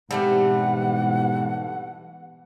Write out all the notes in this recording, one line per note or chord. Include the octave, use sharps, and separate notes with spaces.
G#2 B2 E3 G3 A3 C4 F#5